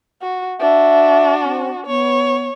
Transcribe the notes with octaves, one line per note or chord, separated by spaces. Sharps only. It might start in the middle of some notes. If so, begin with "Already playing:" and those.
F#4
D4 F#4 E5
C4
B3 C#5